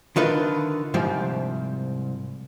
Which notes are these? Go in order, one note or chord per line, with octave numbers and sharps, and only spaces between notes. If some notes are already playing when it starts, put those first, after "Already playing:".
D3 D#3 F4 B4
C2 G#2 F3 G4